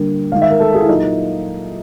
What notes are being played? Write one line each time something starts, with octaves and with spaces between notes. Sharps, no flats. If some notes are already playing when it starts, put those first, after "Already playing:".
Already playing: D3 G3 A#3
D#3 G#3 F5
E5
A#4
A4
G#4
E4
A#2 F#3 A#3 D#4